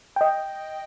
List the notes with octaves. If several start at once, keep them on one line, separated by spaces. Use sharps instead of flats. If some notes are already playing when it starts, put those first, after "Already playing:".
D#5 G5